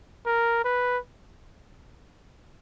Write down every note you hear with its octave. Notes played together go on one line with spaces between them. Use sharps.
A#4
B4